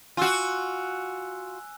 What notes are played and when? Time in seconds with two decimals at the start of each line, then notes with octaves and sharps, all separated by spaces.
0.17 F4 F#4 G#5 E6 F#6